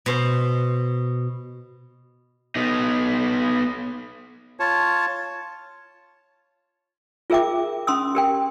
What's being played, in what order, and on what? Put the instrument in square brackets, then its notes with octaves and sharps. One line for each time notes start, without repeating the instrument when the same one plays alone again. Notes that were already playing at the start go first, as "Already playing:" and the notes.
[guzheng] B2 C5
[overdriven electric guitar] B3 D#4
[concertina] F4 C#5 A5
[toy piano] F4 G#4 A#4 E5 G5 D6
C#4 B5 C6 D#6 E6
G4 A#4 G5